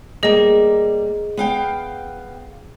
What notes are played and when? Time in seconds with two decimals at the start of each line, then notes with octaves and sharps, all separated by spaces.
0.23 G3 A#3 G#4 D#5
1.37 B3 F5 G5